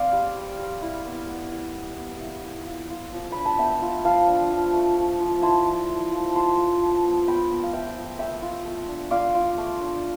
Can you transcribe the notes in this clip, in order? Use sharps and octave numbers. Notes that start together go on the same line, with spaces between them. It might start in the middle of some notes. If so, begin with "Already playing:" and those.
Already playing: C4 C5 D5 F5
G3
G3
G3
E4
B3
B3
E4
B3
B3
E4
E4
F4
F4
F3
D4 B5
A5
B3 E5 G5
F4
F3 F5 A5
D4
F3
A3
F3
F3
E4 A5 C6
E4
A3
F3
F3 A5 C6
F4
F3
B3
B3 G5 B5
B3
F5
F3 E5 G5
F4
A3 E5 G5
F4
A3
D4
F4 D5 F5
F4
A3
D4